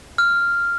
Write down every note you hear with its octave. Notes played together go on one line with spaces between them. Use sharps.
F6